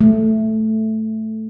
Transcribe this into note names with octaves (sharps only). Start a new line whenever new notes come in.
A3